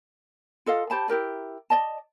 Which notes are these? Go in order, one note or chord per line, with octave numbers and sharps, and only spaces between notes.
F4 A4 D#5 F5
G4 C5 A5 B5
E4 G4 A#4 D5
D5 D#5 A5